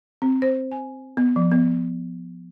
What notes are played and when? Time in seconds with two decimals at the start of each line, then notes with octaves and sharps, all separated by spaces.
0.22 C4
0.42 C5
0.72 G#5
1.17 B3
1.36 F3
1.51 B3